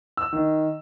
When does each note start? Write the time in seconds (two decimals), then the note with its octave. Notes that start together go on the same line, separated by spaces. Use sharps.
0.17 E6
0.33 D#3